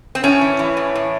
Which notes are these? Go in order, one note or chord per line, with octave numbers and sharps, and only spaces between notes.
C4
A2 C#4
E3
E3
A2
A2